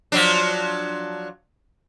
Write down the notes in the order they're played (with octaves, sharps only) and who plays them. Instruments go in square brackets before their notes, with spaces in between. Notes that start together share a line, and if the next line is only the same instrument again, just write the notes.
[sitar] F3 F#3 D4